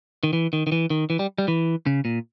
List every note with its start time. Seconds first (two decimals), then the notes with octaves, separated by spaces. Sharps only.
0.23 D#3
0.33 E3
0.53 D#3
0.67 D#3
0.72 E3
0.90 D#3
1.10 E3
1.19 G3
1.38 G3
1.48 E3
1.86 C#3
2.05 A#2